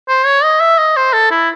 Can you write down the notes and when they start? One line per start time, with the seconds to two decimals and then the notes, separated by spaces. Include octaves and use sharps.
0.08 C5
0.25 C#5
0.43 D#5
0.60 E5
0.78 D#5
0.97 C5
1.13 A4
1.31 E4